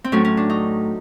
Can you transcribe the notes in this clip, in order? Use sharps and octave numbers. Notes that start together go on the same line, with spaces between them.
C4
A2 F#3 A3 C#4
C#4
D4
D#4